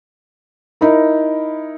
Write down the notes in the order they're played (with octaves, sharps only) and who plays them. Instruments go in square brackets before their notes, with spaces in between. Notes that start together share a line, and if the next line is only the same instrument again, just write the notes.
[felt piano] D#4 E4 A#4